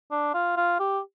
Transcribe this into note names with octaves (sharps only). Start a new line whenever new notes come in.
D4
F4
F4
G4